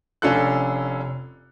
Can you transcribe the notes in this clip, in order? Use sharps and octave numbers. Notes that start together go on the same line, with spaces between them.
F1 C#4 D4 F4 A4 F#6